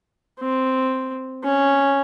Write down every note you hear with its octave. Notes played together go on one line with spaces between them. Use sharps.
C4
C#4